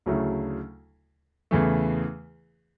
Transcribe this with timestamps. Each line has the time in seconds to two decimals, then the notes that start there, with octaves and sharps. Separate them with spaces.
0.06 D2 C#3 F#3 A3 E4
1.51 E2 C#3 E3 A3